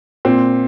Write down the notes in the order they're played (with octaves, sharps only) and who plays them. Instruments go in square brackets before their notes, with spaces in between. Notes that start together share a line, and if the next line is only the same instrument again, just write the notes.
[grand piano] A#2 C4